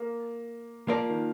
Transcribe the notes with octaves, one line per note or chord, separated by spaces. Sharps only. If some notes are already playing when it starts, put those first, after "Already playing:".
Already playing: A#3
F3 A#3 F4 A#4 D5
D#3